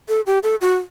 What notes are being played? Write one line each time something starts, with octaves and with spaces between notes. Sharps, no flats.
A4
G4
A4
F#4